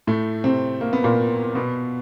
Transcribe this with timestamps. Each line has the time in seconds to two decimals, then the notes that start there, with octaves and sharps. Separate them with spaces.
0.07 A2 A3
0.44 C3 C4
0.81 A#3
0.93 B3
1.04 A#2 A#3
1.55 B2 B3